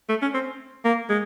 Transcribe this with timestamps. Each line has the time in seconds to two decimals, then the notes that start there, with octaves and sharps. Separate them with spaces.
0.09 A3
0.22 C#4
0.34 C4
0.85 A#3
1.10 G#3